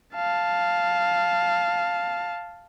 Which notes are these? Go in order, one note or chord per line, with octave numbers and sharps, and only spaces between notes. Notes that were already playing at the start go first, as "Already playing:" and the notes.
F5 A5